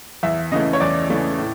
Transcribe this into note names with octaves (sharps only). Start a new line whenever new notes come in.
E2 E5
C#3 E3 A3 D#5
C#5
E2 D5
C#3 E3 A3
A2